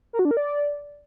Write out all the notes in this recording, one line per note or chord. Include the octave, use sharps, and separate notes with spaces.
A#4
F#4
D4
A#4
D5